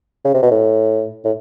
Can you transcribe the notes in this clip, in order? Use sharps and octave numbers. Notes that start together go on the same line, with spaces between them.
C#3
C3
B2
A2
A2